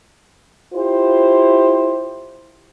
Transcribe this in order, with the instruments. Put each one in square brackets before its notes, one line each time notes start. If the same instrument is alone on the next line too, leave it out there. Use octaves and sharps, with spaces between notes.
[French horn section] E4 F4 G4 C5